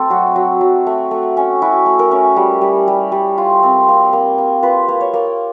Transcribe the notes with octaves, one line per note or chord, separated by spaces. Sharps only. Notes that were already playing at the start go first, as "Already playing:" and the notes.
Already playing: A3 C4 A4
F#3 F#4
F#3
F#3
A3
A3
C#4
E4 F#4
A3
A#4
C#4
G3
G3
G3
G3
F4
C4
A#3
A#3
A#3
F4 B4
A#3
C#5
A#3